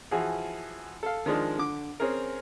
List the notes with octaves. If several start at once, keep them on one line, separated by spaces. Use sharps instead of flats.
E3 F3 F#4 G#4
A4 F5
D#3 F3 G#3 D4
D3 D6
C4 C#4 G#4 A#4